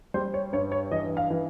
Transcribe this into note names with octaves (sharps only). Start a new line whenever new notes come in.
G3 C5
C#5
G2 C#5
C#5
E3 D#5
F5
E3